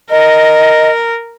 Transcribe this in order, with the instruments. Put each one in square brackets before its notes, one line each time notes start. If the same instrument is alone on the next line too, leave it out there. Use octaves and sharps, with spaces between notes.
[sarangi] A#4 [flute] D#5